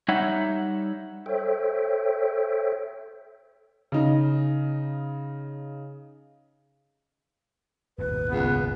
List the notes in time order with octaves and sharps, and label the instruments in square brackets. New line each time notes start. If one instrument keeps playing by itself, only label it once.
[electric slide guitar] G3 D#4 C#5 E5 F#5
[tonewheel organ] A4 C5 C#5 E5 G5
[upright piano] C#3 D#4
[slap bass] D#1 G#1 D#2 [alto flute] B4
[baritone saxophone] C#2 [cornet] B3